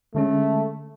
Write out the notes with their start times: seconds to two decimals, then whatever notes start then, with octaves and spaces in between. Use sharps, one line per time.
0.15 D3 G#3 A3 C#4